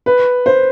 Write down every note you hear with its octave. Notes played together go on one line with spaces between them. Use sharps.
B4
C5